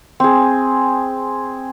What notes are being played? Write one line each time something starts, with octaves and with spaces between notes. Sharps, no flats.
C4 G#4